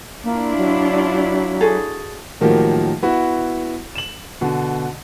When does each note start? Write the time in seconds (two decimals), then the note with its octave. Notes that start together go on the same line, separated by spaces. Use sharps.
0.24 A#3 D4 E4 F4
0.57 F#3
1.61 F#4 G#4 A4
2.41 A2 D#3 F3 F#3 A#3 G4
3.02 B3 E4 F#4
3.95 E7 F#7
4.41 B2 D3